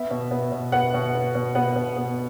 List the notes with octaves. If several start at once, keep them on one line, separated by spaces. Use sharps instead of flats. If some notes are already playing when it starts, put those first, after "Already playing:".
Already playing: B3 E5
B2
B3
B2
B3 F#5
B2
B3
B2
B3 F#5
B2
B3